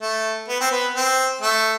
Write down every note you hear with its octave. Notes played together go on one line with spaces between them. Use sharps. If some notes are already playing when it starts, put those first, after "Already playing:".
A3
B3
C4
B3
C4
A3